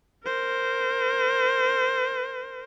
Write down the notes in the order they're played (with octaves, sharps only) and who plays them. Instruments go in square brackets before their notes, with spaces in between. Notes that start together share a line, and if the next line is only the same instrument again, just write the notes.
[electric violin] A#4 C5